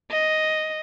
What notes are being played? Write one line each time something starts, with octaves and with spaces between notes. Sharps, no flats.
D#5